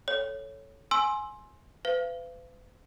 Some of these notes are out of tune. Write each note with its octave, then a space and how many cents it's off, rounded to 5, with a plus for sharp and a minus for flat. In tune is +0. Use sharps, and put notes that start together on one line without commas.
A4 +0 C#5 +0
G#5 +15 C6 +15 E6 +0
B4 +40 F5 -35